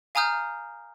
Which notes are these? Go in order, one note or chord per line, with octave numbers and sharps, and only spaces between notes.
F5 G#5 A#5 D#6 F6 G6